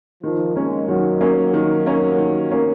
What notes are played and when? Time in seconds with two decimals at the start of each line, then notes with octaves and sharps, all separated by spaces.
0.23 D#3 F3
0.55 G#3 A#3 C#4
0.88 D#3 F#3
1.21 A#3 C#4
1.54 D#3
1.86 A#3 C#4
2.18 D#3
2.51 A#3 C#4